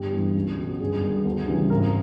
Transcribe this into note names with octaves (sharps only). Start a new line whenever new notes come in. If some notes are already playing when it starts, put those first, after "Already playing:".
Already playing: G1 G4
G2 E3
C#2
B2 F#3
G1 G#4
G2 D#3
D2
C#3 E3 G3
G#1 A#4